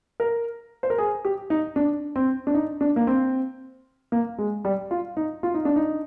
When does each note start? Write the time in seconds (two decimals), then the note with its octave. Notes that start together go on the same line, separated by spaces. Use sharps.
0.20 A#4
0.83 C5
0.90 A#4
0.98 G#4
1.25 G4
1.50 D#4
1.76 D4
2.16 C4
2.47 D4
2.54 D#4
2.81 D4
2.96 A#3
3.07 C4
4.12 A#3
4.38 G#3
4.65 G3
4.91 F4
5.17 D#4
5.43 F4
5.54 D#4
5.65 D4
5.76 D#4